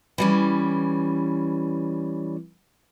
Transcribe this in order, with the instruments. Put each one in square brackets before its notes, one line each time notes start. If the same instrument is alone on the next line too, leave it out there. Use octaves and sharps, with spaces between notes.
[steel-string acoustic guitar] E3 G3 C#4